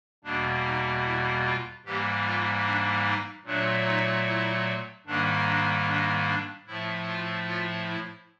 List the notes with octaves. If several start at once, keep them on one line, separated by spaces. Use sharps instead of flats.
E2 B2 G3 A#3 D4
D#4
E4
F4
G#2 E3 G3 A#3 G4
F4
D4
D#4
A#2 F#3 A3 D4
D#4
E4
G#2 D#3 G3 A#3 D4
D4
D4
D4
A2 F3 A3 E4
F4
F4
E4